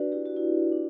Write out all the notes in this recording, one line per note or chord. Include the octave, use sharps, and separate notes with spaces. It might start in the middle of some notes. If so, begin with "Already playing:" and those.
Already playing: D4 F#4 B4 D5
E4 G4
F#4
E4
D4